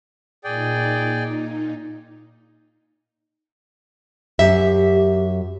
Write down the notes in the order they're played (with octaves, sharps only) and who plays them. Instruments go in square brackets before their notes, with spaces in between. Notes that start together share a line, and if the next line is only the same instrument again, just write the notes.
[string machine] A#2 D#4 [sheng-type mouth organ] G#4 D5 G5
[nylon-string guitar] F#2 E5 [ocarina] G4